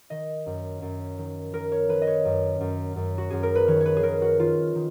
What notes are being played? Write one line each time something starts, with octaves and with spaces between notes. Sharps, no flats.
D#3 D#5
F#2
F#2
D#3
D#3 A#4
C#5
D#3 B4
D#5
C#5
F#2
F#2
F#2
F#4
F#2 G#4
A#4
B4
D#3 C#5
C#5
B4
G#4
D#3 A#4
F#4
D#3 F4
D#3